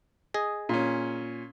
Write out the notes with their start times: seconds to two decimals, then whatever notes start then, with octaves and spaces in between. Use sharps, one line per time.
0.34 G#4 D#5
0.69 A#2 C#4